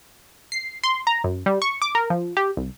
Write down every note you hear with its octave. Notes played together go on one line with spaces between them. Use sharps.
C7
C6
A#5
F#2
G3
C#6
D6
A#4
F3
G4
C2